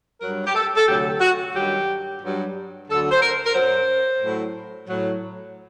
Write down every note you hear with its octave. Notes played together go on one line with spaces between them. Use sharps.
G2 F#3 A#4
G4
A4
A4
D2 C3 F#3 G4
F#4
G2 D#3 F#3 G4
G2 F#3
D2 D3 F#3 A4
C5
A#4
A#4
F#2 F#3 C5
A2 F#3
A2 F#3